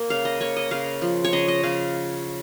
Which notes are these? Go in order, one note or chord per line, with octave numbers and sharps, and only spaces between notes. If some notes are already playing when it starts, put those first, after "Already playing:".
Already playing: A#3
C#3 F5
D#5
A#3 C#5
D#5
C#3 F5
F3
C#5
C#3 D#5
D#5
C#3 F5